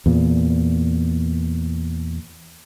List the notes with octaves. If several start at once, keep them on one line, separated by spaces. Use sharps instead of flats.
E2 A#2